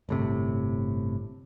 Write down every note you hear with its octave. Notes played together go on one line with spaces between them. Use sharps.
G1 A2 C3